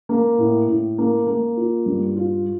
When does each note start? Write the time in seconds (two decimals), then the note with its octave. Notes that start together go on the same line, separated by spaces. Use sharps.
0.09 A#3
0.38 A2
0.68 A2
0.98 A#3
1.27 A#3
1.57 F4
1.86 G2
2.16 F4